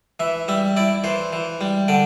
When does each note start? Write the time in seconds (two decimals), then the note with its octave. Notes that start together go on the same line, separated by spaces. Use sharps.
0.20 E3 E5
0.48 G3 E5
0.77 E4 D5
1.04 E3 C5
1.33 E3
1.61 G3
1.88 D3 D5